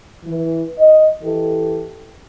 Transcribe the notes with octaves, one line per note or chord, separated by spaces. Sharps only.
E3
D#5
E3 G4 A4